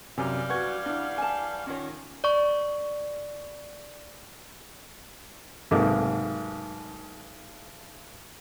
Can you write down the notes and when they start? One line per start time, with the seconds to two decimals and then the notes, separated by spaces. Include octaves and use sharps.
0.18 F#2 C3 E3 G3 F5 G#5
0.50 F#4 B4 F#5 C#6 G#6
0.86 D4 E4
1.18 G#5 A5
1.67 D#3 C#4 F4 C#5
2.24 D5 C#6
5.71 B1 G#2 C3 A3 A#3 D6